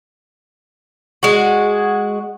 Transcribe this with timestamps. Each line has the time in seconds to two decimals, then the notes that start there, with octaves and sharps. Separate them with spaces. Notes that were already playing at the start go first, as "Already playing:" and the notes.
1.23 G#3 F#4